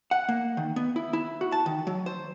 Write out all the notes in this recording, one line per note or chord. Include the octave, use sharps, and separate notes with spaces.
F#5
A#3
D#3
B3
E4
E4
F#4
A5
D#3
F#3
C5